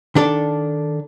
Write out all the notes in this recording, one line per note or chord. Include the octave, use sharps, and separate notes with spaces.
D#3 D4 A4 D5